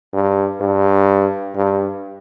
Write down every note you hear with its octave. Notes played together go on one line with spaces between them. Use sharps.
G2
G2
G2